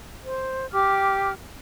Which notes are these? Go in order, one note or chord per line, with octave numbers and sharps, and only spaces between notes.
C5
G4 D6 F6